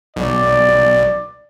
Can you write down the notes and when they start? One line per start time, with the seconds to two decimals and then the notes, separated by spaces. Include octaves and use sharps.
0.16 B1 D5